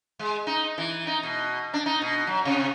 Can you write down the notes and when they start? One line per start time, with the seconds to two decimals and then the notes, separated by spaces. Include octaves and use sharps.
0.19 G#3
0.47 D#4
0.78 E3
1.07 D#4
1.23 B2
1.74 D4
1.86 D#4
2.02 B2
2.27 F#3
2.45 C3